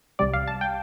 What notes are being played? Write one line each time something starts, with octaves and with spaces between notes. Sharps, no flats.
C2 C3 G3 D5
F5
A5
G5